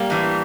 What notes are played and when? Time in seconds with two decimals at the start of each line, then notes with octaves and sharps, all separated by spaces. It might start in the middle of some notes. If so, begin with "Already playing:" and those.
Already playing: G3 A#3
0.10 A2 E3